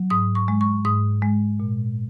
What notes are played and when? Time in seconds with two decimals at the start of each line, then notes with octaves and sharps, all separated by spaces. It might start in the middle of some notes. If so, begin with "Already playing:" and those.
Already playing: F#3
0.10 G#2 D#6
0.35 C#6
0.48 G#3
0.61 C#6
0.85 G#2 D#6
1.22 G#3
1.60 A#2